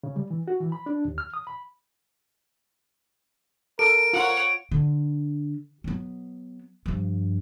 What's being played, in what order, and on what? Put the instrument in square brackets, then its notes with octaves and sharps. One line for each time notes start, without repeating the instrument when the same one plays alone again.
[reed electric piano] C#3
G3
E3
F#4
E3
B5
D4
D#2
F6
D#6
B5
[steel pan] A4 [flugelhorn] A#4 [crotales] D7
[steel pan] F4 [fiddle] C#5 F#5
[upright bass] D3
F#3 B3
G2 F3